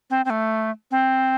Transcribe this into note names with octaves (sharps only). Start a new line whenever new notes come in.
C4
C4
A3
C4